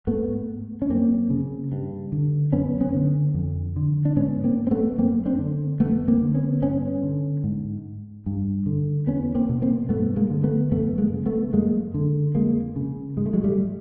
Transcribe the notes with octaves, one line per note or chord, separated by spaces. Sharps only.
G#2 A3 B3
C#4
F#2 A#3 C4
C#3
G2
D3
F#2 B3 C#4
B3 C#4
D3
F2
D3
D4
G#2 B3 C#4
A#3 C4
C4
A3 B3
F#2 A#3 C4
C4 D4
D3
F2 A3 B3
A#3 C4
D3
B3 C#4
G2 B3 C#4
D3
G#2
G2
D3
E2 B3 C#4
A#3 C4
B2
A#3 C4
G2 A3 B3
G#3 A#3
D3
A3 B3
F#2 A3 B3
G#3 A#3
C#3
A3 B3
F#2 G#3 A#3
D3
F2 G#3 A#3
C#3
G#2 G#3
A3
F#3 G#3
G3 A3